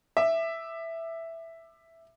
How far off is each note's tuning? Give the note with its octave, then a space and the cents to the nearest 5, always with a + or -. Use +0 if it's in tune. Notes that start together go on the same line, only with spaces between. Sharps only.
E5 +0 D6 +30